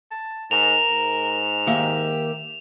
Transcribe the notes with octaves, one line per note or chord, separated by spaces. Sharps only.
A5
G#2 A#4 E7 F7
G#2
D#3 A#3 G4 E5